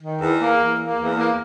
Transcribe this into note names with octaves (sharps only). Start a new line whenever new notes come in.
D#3
E2
A#3
E2
A#3
E2
A#3